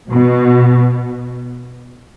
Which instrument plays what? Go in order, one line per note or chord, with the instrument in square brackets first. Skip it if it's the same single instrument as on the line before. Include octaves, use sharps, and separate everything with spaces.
[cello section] B2